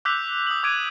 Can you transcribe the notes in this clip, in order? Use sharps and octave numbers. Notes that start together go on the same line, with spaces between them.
D6 E6 F#6 G6 B6 F7
D#6 F#7
D6 G#6 D7 D#7